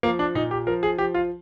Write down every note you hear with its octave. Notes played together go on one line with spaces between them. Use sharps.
F3 A#3
D4
A#2 D#4
G4
F3 A#4
G#4
F3 G4
F4